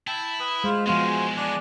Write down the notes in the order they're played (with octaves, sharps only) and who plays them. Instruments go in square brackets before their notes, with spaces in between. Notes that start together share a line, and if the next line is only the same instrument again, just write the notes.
[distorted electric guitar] E4 [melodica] G5 A5
[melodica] B4 D#6
[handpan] G#3 [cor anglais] F4 [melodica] C5
[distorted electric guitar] E3 G#3 [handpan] F3 B3 [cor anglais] F4 [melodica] F#4 C5
[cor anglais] G#5
[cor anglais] D4 [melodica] F#5 G#5 A5